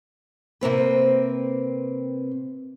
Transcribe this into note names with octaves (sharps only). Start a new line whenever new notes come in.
C3 A#3 C4 B4